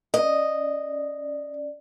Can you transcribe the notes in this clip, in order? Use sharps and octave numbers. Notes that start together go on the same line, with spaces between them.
C#4 D5 D#5